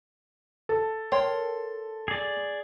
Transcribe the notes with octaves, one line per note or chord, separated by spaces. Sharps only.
A4
A#4 C#5 G5 C6
G#4 D5